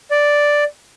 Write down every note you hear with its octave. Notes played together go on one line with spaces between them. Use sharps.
D5